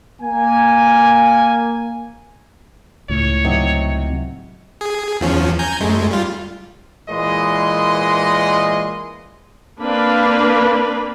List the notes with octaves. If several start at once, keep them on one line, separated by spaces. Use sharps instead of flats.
A#3 G#5
C#2 A2 C#5
C3 F#3 D#4
G#4
E2 F3 C#4
G#5 A#5 G6
F#2 G#3 A3
G3 F4
A#2 E3 G#3 D#5 C6
A#3 C4 D4 B4 F5 B5